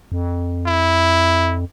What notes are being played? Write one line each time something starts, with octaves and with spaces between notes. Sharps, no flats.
F2
E4